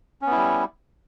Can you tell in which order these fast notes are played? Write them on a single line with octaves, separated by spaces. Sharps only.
C#4 B3 E4 G3